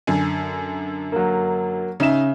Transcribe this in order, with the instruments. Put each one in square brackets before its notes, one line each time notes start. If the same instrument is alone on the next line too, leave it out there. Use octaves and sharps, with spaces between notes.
[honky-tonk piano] F#2 D3 G#5
[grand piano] F#3 A#3
[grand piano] C#3 E5 E7 [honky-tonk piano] D#4